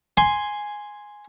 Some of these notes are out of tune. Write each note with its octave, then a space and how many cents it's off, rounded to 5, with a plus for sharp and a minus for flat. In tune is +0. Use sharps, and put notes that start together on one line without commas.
G#5 +0 C6 +0